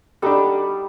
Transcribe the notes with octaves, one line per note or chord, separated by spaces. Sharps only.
G3 D4 D#4 F#4 A4 B5